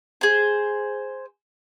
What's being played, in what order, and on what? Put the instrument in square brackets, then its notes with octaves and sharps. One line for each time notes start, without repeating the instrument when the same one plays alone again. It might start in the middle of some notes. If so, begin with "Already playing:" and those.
[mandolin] G#4 C5